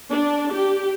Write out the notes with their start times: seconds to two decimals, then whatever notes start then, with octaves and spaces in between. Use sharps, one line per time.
0.10 D4
0.52 G4